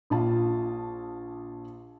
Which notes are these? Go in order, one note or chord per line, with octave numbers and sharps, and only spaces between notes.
A#1 F4 A5